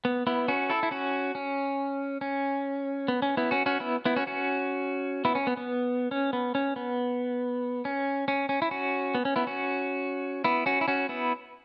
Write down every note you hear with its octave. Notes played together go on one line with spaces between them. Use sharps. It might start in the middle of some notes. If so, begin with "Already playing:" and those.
B3
B3 E4
C#4 F#4
E4 A4
E4
C#4 F#4
C#4
C#4
B3
C#4
B3 E4
C#4 F#4
C#4 F#4
B3 E4
B3 E4
C#4 F#4
C#4 F#4
B3 E4
C#4
B3
B3
C#4
B3
C#4
B3
C#4
C#4
C#4
E4
C#4 F#4
B3
C#4
B3 E4
C#4 F#4
B3 E4
C#4 F#4
E4
C#4 F#4
B3 E4